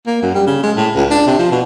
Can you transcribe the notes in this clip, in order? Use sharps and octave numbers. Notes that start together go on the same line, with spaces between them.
A#3
F#2
G3
C#3
G#3
A2
C#2
D4
C3
F3
B2